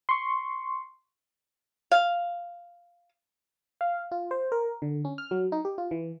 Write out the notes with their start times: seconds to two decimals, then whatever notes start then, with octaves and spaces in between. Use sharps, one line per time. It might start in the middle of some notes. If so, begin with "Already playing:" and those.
0.09 C6 C#6
1.91 F5
3.81 F5
4.12 F4
4.31 C5
4.52 A#4
4.82 D3
5.05 C#4
5.18 F6
5.31 F#3
5.52 D#4
5.65 G4
5.78 F4
5.91 E3